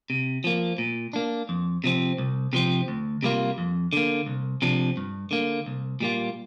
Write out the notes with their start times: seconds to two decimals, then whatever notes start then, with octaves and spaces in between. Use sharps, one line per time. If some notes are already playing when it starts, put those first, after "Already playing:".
0.10 C3
0.44 F3 A#3
0.78 A#2
1.13 A#3 D4
1.49 F2
1.84 C3 F3 C4
2.18 C2
2.53 C3 F3 C4
2.88 D2
3.23 C3 G3 A#3 F4
3.58 F2
3.93 D3 A#3
4.26 C2
4.62 C3 F3 D4
4.97 G2
5.31 D3 A#3
5.66 C2
6.00 A#2 G3 A#3 F4